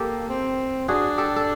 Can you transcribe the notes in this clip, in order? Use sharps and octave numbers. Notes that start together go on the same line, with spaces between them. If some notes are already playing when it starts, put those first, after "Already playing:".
Already playing: A#3 G4 A4
C4
D4 F#4 G#4
G4 A4
A4